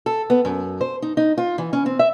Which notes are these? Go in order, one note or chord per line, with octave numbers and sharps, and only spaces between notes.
A4
B3
F#2
C5
D#4
D#4
F4
E3
C#4
C4
E5